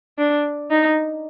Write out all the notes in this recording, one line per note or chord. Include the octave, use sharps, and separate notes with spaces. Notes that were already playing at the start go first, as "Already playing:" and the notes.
D4
D#4